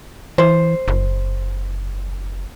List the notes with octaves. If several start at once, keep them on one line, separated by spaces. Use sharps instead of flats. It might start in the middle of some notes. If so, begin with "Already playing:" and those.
E3 C5
F#1